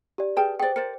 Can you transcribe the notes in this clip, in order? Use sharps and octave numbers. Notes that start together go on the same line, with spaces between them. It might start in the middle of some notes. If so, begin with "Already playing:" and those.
G4 D5
G#4 B4 G5 A5 F6
G#4 C5 D5 G5
A#4 C5 D5 C#7